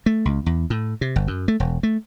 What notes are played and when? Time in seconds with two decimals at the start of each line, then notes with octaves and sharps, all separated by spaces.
0.06 A3
0.25 C#2
0.46 E2
0.70 A2
1.01 C3
1.16 G1
1.28 F#2
1.48 A3
1.60 E1
1.83 A3